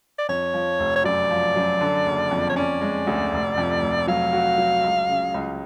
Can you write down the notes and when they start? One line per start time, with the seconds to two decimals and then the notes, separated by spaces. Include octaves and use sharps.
0.18 D5
0.28 F2 C#5
0.54 F3
0.79 F1
0.96 C#5
1.04 F#2 D5
1.31 F3
1.56 F#2
1.81 D3
2.06 F#1
2.31 F2
2.49 C#5
2.56 C#4 D5
2.81 G#3
3.07 D2
3.32 F1
3.57 F2
3.82 F1
4.07 F#3 F5
4.33 F#4
4.58 F#3
4.84 C#2
5.09 C#3
5.34 C#2